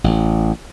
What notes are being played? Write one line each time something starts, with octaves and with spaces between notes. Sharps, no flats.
A1